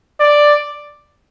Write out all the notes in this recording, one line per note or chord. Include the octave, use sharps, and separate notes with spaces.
D5